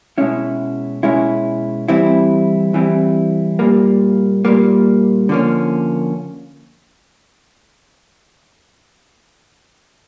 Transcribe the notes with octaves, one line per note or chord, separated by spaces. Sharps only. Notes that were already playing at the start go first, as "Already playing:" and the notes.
B2 G#3 C#4 E4
B2 G#3 C#4 E4
E3 G3 C4 E4
E3 G3 C4 E4
A#2 G3 A#3
A#2 G3 A#3
D3 F3 A#3 C#4